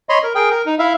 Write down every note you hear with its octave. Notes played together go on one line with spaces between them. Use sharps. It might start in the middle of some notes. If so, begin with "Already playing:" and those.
C#5 D#5 B5 C6
A#4
G#4 A#4 G5
A#4
D#4
E4 E5 F5